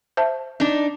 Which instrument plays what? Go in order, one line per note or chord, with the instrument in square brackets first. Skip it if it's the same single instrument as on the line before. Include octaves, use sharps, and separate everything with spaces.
[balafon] C5 E5 A5
[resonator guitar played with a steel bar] D4 D#4